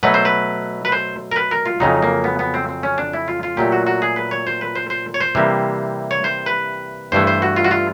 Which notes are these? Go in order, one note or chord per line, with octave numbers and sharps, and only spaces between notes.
B2 F#3 A3 B4
C5
B4
B4
C5
A#4
B4
A#4
F4
F2 C#3 F#3 D#4
A#3
B3
B3
C4
C4
C#4
D4
E4
F4
F4
A#2 F#3 A3 G4
F#4
F#4
G#4
B4
C#5
C5
B4
C5
C5
C#5
C5
C3 E3 G3 A#3
C#5
C5
B4
G2 E3 A3 C5
C5
F#4
F4
F#4
F4